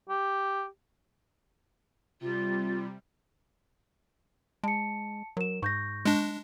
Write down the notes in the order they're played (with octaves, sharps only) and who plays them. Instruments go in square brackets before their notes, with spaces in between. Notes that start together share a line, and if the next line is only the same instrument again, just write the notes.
[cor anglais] G4
[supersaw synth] C3 G3 [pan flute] F4
[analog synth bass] G#3 [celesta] A5 C#7
[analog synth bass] F#3 [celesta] A#4 E7
[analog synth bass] G#2 [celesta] C#6 G6 A#6
[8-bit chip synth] G#3 D4